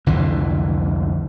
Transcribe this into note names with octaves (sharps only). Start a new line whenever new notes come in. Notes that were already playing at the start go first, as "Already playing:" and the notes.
C2 F2 D3 E3